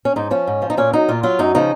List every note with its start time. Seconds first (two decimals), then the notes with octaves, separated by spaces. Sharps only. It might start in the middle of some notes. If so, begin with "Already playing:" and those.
0.05 C#4
0.16 G#2 D#4
0.31 F3 C#4
0.47 G#2
0.62 F3
0.70 D#4
0.77 A#2 C#4
0.93 F#3 D#4
1.09 A#2 F4
1.23 F#3 F4
1.39 F#2 D#4
1.55 C#3 F3 D#4